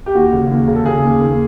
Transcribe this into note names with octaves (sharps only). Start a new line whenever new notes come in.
G4
D#2 F#4
C#3
D#2
C#3
A4
C#3 G#4
D#2
D#2